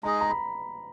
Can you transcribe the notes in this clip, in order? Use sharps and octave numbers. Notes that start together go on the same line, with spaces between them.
G#3 D#4 G#4 D#5 A#5
A#5
B5